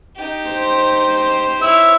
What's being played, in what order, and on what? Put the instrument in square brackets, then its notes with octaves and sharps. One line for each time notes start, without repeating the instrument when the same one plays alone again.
[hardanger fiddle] D#4 G4
[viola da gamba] C5
[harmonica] E4 E6 [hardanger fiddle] C#5